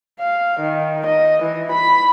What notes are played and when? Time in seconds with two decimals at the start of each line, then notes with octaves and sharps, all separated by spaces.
0.20 F5
0.60 D#3
1.06 D#5
1.43 E3
1.72 B5